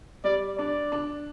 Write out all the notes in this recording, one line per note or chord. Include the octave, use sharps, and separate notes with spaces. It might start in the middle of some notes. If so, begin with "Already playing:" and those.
G3 D5
D4 D5
D4